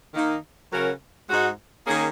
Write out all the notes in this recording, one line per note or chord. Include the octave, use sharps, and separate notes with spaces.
D#3 A#3 D#4
C#3 F#3 C#4 F#4 A#4
G#2 G#3 D#4 F#4
D#3 A#3 C#4 G#4